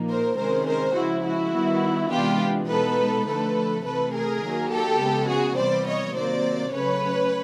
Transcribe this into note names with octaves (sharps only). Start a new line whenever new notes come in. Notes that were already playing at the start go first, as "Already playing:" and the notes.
Already playing: A#2 F3 A#3 D#4
A#4 C5
C3 D#3 G#3 C#4 A#4 C5
A#4 C5
C#3 F3 G#3 E4 F#4
E4 F#4
D#3 G3 B3
C3 E3 G#3 B3 D4 F4 G4
B2 G#3 B3 D#4 A4 B4
D3 F3 A3 A4 B4
C3 E3 A3 A4 B4
G#4 A#4
D#3 F#3 A#3
G4 A4
C#3 F3 G#3 B3
F#4 G#4
C3 E3 G3 B3 C5 D5
C#5 D#5
C3 D#3 F#3 A#3 C5 D5
C#3 F#3 A3 C#4 B4 C#5